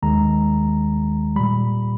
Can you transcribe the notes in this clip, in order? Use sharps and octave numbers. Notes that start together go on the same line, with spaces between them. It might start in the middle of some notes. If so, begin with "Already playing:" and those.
D#2 D#3 G#3 A#5
A#2 G3 B5